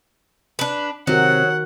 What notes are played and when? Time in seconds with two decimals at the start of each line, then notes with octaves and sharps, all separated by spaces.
0.59 D4 B4
1.07 C3 D#3 F#3 F#4 A#4 F#5